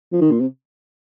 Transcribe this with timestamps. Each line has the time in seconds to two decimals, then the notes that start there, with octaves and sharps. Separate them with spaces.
0.12 F3
0.21 D#3
0.31 A#2
0.40 C3